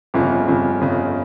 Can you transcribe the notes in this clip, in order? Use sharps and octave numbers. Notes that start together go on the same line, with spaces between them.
G1 F2 C#3
G1 F2 C#3
G1 F2 C#3